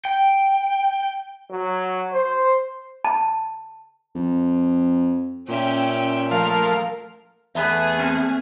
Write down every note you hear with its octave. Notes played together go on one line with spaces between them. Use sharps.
G5
F#3
C5
A5
F2
A#2 C#4 E5 G5
F3 A3 A#4 F5
E2 A3 B3 G#4 E5
A#3 C4 F6